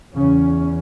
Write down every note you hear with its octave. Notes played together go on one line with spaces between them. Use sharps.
E2 C#3 C#4